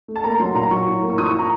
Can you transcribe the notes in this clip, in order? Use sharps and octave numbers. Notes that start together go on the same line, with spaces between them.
A3
A5
A#3 A#5
F#3 C6
A#2 A#5
F#3 C#6
A2
A#3
C#6
F3 D#6
C#6
A2 A#5